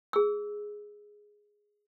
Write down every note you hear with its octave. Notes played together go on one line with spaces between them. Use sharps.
G#4 E6